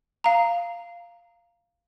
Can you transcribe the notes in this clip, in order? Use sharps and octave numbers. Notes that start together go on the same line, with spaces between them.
F5 A#5